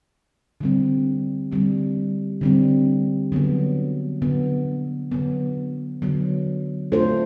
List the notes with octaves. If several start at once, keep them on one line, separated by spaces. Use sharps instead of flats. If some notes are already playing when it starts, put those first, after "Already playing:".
D3 G3 C4
D3 G3 C4
D3 G3 C4
D3 F#3 B3
D3 F#3 B3
D3 F#3 B3
D3 F#3 B3
A3 D4 F4 A4 C5